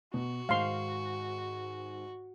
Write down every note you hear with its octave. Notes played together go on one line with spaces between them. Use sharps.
B2 F#4
G#2 D#3 C5 F5 C6